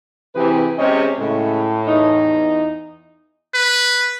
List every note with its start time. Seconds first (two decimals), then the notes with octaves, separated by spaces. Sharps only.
0.35 C3 E3 G4 G#4 B4
0.79 C3 G#3 C4 C#4 C#5 D#5
1.19 A2 C#3 G#3
1.87 E2 D#4
3.54 B4